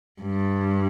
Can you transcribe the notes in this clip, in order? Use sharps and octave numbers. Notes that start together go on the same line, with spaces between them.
G2